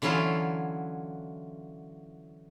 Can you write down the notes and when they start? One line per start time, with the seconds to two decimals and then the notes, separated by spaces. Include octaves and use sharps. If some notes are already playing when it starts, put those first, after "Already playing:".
0.02 D3 E3 F#3 C#4 E4 F4